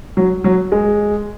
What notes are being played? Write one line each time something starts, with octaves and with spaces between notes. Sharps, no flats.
F#3
F#3
G#3